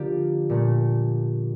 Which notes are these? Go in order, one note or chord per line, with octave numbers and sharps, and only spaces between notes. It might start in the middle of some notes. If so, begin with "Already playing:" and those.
Already playing: D3 F3 A#3 F4 G4
A#2 A3